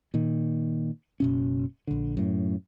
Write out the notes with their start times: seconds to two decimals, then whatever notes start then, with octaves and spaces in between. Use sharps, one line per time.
0.14 A#2 D#3
1.20 F#1 B2 C#4
1.87 A#1 D3
2.17 F#2 A2